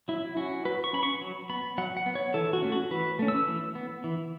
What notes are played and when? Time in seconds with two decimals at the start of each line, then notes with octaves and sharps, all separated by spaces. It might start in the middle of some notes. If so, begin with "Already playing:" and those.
0.08 F#3 E4
0.37 C#4 F#4
0.65 F#3 B4
0.84 C#6
0.93 C#4 B5
1.03 C#6
1.21 F#3
1.49 B3 B5
1.78 F#3 F#5
1.97 F#5
2.06 B3
2.15 C#5
2.34 E3 A4
2.53 F#4
2.62 A3 C#4
2.72 F#4
2.91 E3 B4
3.19 A3 C#4
3.28 E6
3.47 E3
3.75 B3
4.04 E3